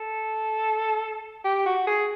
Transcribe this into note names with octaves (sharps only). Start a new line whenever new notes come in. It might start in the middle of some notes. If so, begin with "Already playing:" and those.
Already playing: A4
G4
F#4
G#4